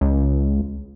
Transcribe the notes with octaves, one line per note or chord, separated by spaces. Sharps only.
C#2